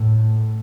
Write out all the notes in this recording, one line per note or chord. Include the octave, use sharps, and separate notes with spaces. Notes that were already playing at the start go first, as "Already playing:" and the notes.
Already playing: A2